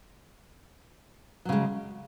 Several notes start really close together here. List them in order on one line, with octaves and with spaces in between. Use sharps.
F#3 C#3 G#3